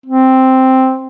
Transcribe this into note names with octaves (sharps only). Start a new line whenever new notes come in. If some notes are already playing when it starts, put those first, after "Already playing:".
C4